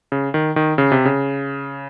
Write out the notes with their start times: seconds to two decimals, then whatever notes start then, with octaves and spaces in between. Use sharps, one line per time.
0.12 C#3
0.34 D#3
0.56 D#3
0.78 C#3
0.92 C3
1.05 C#3